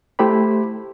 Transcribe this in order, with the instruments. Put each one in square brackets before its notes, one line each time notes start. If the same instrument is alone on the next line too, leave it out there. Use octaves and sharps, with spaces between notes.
[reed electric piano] A3 E4 G4 C5 B5